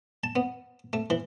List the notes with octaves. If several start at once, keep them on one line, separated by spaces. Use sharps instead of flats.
A5
B3
A3
E3